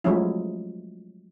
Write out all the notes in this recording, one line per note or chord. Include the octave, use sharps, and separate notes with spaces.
F3 F#3 G#3 A3 C#4 E4